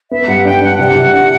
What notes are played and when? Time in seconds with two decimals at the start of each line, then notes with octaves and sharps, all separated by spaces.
0.11 B3 E5
0.28 G2 F#5
0.45 D4 G5
0.61 D4 F#5
0.78 C3 F#5
0.95 C3
1.12 D4